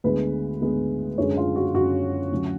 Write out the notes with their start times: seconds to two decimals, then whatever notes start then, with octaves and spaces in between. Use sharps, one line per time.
0.04 D2 D3 G#3 B3 B4
0.61 D2 D3 G#3 B3
1.18 F#2 D3 G#3 C#4 C#5
1.37 F4
1.56 F#4
1.74 F#2 D3 G#3 C#4 F#4
2.32 D2 D3 F#3 C#4